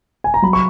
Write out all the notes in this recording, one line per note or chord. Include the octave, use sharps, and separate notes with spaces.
G#5
A#5
F#3 B5
C#6